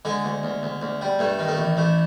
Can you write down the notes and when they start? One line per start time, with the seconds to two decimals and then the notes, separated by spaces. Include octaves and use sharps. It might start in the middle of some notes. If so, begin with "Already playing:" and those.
0.05 D3 G#3
0.25 D2
0.43 D2
0.63 D2
0.82 D2
1.01 G3
1.19 G2 A3
1.39 D#3
1.48 A3
1.58 A1
1.77 A1 A3